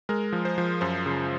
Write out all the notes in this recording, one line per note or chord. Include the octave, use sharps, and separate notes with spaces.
G#3 A#4
F3
C5
F3
F#2 C5
C#3